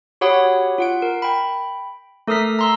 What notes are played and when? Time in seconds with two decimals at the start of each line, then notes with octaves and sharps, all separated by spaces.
0.21 F#4 G4 C#5 F#5 B5 D#6
0.78 F4 F#5 D7
1.02 A#4
1.22 G5 B5
2.27 A3 A4 A#4 D#6 F6 B6
2.59 A#5 C6 E6